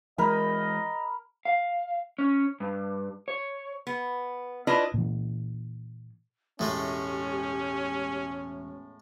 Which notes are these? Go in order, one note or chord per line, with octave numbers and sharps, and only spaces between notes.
E3 G#3 A#4 D#5 B5
F5
C#4
G2
C#5
B3
D4 E4 F4 B4 D#5
A#2 E3
E1 A2 G#3 A3 C#4 G4 E5